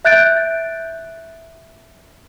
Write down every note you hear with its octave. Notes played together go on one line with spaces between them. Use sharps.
E5 F#6 G6 A6 D7